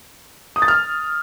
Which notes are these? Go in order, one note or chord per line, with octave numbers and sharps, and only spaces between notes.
D#6
A6
F6